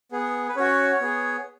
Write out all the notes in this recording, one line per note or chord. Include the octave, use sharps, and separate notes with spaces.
B3 G#4
B4
C#4 F#4 C#5
B3 G#4